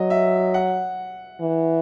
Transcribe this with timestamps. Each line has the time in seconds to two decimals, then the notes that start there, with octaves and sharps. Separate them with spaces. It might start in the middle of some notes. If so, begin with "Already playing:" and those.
Already playing: F#3 D#5
0.10 E5
0.54 F#5
1.41 E3